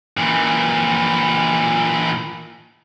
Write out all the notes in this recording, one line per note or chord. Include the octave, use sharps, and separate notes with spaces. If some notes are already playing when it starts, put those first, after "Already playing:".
A#2 E3